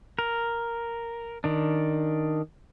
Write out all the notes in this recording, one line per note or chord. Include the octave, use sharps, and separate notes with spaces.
A#4
D#3 D4